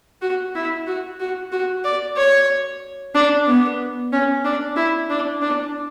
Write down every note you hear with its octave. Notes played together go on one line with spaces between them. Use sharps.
F#4
E4
F#4
F#4
F#4
D5
C#5
D4
B3
C#4
D4
E4
D4
D4